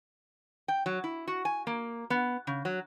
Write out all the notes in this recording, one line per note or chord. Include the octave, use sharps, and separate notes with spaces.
G5
F#3
E4
F#4
G#5
A#3
B3
C#3
F#3